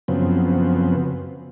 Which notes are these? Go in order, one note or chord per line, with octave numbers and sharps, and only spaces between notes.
F#2 C#3 F3 B3 C4